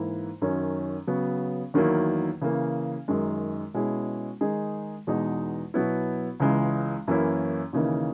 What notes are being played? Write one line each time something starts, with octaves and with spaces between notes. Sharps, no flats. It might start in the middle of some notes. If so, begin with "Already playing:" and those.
Already playing: G#2 E3 A#3 E4
F#2 D#3 F#3 C#4
C#3 F#3 B3
E2 D#3 F#3 A#3 E4
C#3 E3 A#3
F#2 D#3 G#3
B2 G#3 C#4 E4 G#4
D#3 G#3 D#4 G#4
E2 B2 G#3 D#4
B2 F#3 B3 E4
C#2 C#3 E3 G#3
F#2 E3 A#3 C#4 E4
D#2 C#3 E3 A#3 D#4